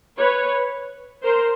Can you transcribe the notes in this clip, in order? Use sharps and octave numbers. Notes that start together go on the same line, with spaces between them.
B4 C#5
A#4 C5